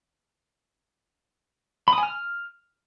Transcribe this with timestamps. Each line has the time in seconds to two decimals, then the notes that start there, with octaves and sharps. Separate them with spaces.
1.88 B5
1.93 D#6
1.98 G#5
2.03 F6